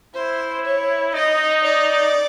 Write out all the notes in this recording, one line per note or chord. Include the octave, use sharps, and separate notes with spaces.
E4 C5
C#5
D#4 D#5
D5